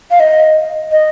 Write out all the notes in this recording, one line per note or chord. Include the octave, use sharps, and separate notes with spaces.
F5
D#5
D#5